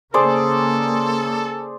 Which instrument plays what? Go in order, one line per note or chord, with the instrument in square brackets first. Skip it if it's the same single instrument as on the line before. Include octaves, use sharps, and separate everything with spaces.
[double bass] C#3 A#3 [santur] G#4 C5 D5 [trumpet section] A4